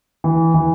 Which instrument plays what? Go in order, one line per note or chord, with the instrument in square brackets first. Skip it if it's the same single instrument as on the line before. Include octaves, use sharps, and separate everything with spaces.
[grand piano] E3
E3